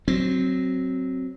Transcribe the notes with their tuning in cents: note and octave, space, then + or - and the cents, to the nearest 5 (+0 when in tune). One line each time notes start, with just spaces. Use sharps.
F#3 +10 C4 +0